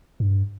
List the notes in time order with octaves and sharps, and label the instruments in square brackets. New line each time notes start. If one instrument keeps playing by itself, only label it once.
[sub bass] G2